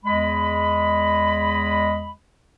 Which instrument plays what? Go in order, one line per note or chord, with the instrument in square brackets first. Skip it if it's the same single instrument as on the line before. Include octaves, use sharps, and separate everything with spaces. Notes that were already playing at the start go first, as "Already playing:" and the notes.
[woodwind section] E2 G#3 D#5 B5